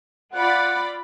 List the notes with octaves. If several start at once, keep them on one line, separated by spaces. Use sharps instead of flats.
F4 D5 F#5 B5